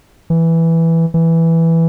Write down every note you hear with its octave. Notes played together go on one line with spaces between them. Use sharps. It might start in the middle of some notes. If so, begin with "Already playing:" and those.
E3
E3